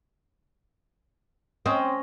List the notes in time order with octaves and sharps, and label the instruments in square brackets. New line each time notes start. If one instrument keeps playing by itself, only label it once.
[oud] C4 [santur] C#4 D#5